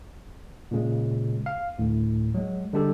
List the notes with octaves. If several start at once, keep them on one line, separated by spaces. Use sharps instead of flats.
A#2 C#3 G#3
F5
D2 A2
F#3 G#3
D3 G3 G#3 D4 G4 A4